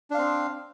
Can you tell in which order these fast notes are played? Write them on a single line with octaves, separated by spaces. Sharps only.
D4 F5 C4